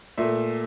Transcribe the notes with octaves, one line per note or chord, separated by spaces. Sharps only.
A#2 A3 E5